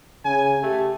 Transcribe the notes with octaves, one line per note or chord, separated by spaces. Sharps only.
C#3 G#5
A3 G4